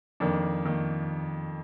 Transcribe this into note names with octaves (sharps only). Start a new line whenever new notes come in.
F2 D#3 A#3 D4
D#3 A#3